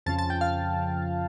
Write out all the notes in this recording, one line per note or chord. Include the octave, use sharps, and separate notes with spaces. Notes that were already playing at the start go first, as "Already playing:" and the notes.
F2 C#3 F3 A5
A5
G5
F5